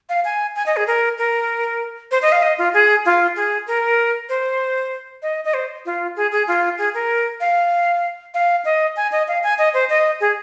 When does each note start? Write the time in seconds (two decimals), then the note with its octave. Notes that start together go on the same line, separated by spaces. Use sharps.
0.09 F5
0.25 G#5
0.56 G#5
0.66 D#5
0.77 G#4
0.87 A#4
1.18 A#4
2.11 C5
2.22 D#5
2.32 F5
2.42 D#5
2.58 F4
2.74 G#4
3.05 F4
3.36 G#4
3.67 A#4
4.29 C5
5.22 D#5
5.45 D#5
5.54 C5
5.86 F4
6.16 G#4
6.32 G#4
6.48 F4
6.78 G#4
6.94 A#4
7.41 F5
8.34 F5
8.65 D#5
8.96 G#5
9.12 D#5
9.28 F5
9.43 G#5
9.58 D#5
9.74 C5
9.89 D#5
10.21 G#4